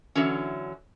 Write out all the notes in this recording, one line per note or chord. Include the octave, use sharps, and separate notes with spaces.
D3 E3 F#3 C#4